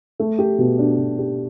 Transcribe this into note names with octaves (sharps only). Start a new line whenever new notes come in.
A3
G4
B2
D4
B2
G4